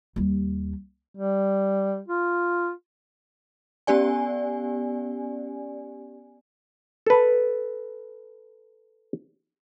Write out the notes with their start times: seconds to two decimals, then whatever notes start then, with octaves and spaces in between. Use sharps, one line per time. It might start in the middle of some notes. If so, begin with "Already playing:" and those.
0.16 D#2 G3
1.17 G3
2.08 F4
3.87 B3 C#4 G4 D5 G#5
7.06 A4 B4